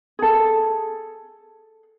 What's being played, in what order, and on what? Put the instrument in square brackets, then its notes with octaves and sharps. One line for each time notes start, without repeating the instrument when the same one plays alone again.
[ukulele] G#4 A4